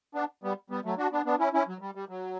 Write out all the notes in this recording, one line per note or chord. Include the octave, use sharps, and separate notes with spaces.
B3 D4
G3 B3
G3 B3
F#3 A3
D4 F#4
B3 D4
B3 D4
C#4 E4
C#4 E4
F#3
G3
G3
F#3